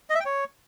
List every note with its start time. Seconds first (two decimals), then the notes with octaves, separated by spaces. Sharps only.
0.10 D#5
0.15 E5
0.20 G5
0.25 C#5